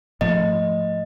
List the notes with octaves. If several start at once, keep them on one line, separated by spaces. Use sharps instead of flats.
G#2 F3 A3 D#5